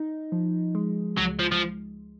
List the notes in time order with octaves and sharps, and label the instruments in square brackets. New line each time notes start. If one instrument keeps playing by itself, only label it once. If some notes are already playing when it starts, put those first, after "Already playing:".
Already playing: [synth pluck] D#4
F3
G#3
[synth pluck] C#2 [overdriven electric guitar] F#3
[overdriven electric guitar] F3
F3